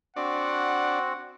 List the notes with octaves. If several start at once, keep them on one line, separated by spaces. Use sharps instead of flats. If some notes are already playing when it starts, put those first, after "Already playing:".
C4 D4 F#4 F#5